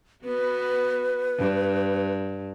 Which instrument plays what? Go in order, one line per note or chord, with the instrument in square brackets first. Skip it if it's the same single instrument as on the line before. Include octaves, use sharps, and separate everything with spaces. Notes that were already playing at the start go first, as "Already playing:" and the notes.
[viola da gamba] B3 F#4 [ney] B4
[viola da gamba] G2